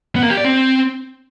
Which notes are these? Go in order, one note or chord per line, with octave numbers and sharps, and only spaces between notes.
B3
A#3
G4
D5
C4